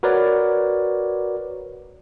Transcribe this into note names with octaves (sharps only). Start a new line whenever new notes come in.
F#4 A#4 B4 C#5 D5